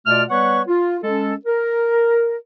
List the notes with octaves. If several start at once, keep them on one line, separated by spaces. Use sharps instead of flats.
B2 A3 F4 D5 F6
G3 B3 B4 C#5 F#5 C#6
F4
G#3 C#4 A4
A#4